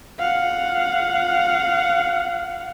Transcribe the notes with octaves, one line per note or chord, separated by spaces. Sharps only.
F5 F#5